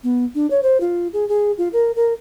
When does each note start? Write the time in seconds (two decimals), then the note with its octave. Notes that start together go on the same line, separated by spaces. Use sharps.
0.04 B3
0.35 D4
0.51 C#5
0.63 C5
0.81 F4
1.13 G#4
1.29 G#4
1.58 F4
1.73 A#4
1.96 A#4